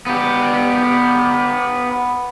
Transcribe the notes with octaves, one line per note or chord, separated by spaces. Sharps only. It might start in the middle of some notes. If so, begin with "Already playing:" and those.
B3 G4